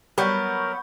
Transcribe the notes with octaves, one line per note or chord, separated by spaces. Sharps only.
F#3 G3 B3 A#4 B5 C#6 G6